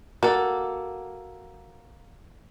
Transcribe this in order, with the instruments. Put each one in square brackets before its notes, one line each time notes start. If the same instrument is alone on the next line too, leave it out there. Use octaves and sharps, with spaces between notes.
[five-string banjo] A#3 A4 [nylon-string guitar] F#4